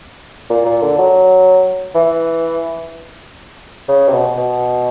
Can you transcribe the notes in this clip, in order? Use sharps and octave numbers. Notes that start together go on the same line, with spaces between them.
A#2
A#2
D3
F#3
E3
C#3
C3
B2
B2